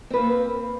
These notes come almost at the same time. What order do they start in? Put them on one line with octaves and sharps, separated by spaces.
C4 B4 A#3